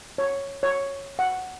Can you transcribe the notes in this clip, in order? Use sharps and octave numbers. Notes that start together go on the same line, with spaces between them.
C#5
C#5
F#5